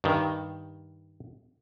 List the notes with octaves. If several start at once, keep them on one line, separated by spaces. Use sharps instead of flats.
G2 D#3